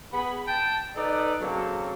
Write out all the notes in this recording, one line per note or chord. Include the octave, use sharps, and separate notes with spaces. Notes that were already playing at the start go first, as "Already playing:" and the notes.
B3 G#4 B5
G5 A5
D#4 A4 B4 D5
C#3 F#3 A#3 C4 A4